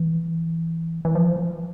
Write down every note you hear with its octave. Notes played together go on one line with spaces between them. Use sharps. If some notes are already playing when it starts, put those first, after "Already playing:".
Already playing: E3
E3
F3